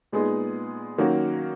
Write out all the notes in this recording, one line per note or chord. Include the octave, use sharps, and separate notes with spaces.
A#2 G#3 B3 D#4 G#4
D#3 F#3 A#3 C#4 F#4